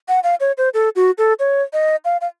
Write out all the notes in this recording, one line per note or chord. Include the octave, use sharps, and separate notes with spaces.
F#5
F5
C#5
C5
A4
F#4
A4
C#5
D#5
F5
F5